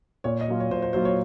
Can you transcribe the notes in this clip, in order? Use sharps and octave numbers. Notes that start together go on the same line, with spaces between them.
A#2 C#5
D#5
F#3 A#3 F4
C#5
A#2 C5
C5
F#3 A#3 F4 C5
C#5